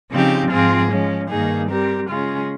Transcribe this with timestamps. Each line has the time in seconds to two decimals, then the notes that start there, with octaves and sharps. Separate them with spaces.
0.11 C#3 F3 C4 D#4 G4
0.50 G#2 F3 C4 F4 G#4
0.90 F3 G#3 C#4
1.29 G2 D#3 A#3 D#4 G#4
1.69 G3 C4 G4 A#4
2.07 C#3 G#3 C#4 F4 G#4